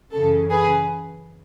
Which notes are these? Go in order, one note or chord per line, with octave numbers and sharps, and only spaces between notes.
F#2 C#3 E3 A4
G#4 B4